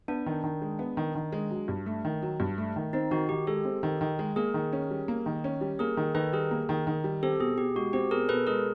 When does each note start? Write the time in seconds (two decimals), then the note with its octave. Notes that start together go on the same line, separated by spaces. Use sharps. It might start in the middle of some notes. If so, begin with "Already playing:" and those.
0.08 B3 D4
0.26 D#3
0.44 D#3
0.62 G#3
0.79 B3
0.97 D#3
1.15 D#3
1.32 G#3
1.51 F#3
1.68 G2
1.86 A3
2.05 D#3
2.22 F#3
2.40 G2
2.58 A3
2.76 D#3
2.93 C4 D#4
3.11 D#3 F#4
3.29 D#3 G4
3.47 G#3 G4 A4
3.65 C4
3.83 D#3
4.01 D#3
4.19 G#3
4.36 A#3 G#4 A#4
4.54 D#3
4.73 C#4
4.91 G3
5.08 A#3
5.26 D#3
5.44 C#4
5.61 G3
5.79 A#3 G#4 A#4
5.97 D#3
6.15 D#3 A4 B4
6.33 G3 G#4 A#4
6.51 A#3
6.69 D#3
6.87 D#3
7.04 G3
7.23 C4 G4 A4
7.40 B2 G#4
7.57 B2 G4
7.76 G#3 F#4
7.93 C4 G4
8.11 B2 G#4 A#4
8.29 B2 A4 B4
8.47 G#3 G#4 A#4